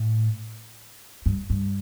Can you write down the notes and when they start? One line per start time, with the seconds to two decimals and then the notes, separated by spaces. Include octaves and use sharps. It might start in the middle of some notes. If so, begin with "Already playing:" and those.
Already playing: A2
1.26 G2
1.50 G2